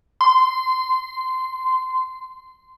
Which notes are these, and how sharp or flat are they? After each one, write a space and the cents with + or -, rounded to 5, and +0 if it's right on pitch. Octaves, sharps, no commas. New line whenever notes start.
C6 -20